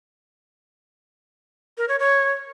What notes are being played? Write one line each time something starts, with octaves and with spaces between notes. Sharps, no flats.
A#4
C#5
C#5